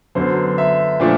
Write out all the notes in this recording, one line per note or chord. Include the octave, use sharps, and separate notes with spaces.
F#2 D3 F#3 B3 C5
E5
A#2 F3 A3 D4